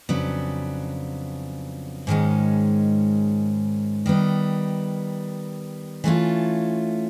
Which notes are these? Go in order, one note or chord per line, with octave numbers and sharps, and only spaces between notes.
F2 C#3 F#3 B3 D4
G#2 D#3 G#3 C#4
D#3 G3 B3
E3 A3 C#4 F4